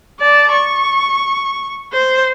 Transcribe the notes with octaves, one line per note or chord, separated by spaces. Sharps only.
D5 A5
C#6
C5